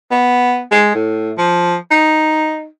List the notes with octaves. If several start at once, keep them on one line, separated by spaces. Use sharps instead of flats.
B3
G#3
A2
F3
D#4